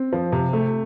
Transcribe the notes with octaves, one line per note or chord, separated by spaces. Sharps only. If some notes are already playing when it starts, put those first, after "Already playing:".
Already playing: C4
F3
C3
A3